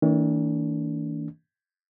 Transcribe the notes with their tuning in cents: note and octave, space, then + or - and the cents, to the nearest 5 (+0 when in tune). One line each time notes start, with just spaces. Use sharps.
D#3 +45 A#3 -40 D4 -35